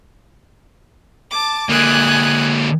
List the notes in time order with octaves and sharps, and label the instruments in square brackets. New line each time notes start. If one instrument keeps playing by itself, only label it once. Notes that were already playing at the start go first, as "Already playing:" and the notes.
[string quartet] A5 D6
[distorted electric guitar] D3 A#3 [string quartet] G#5 D#6 F#6